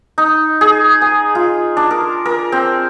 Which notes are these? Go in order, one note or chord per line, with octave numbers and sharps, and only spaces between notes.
D#4
G#4
G#5
F4
D4
A#4
A#4
C4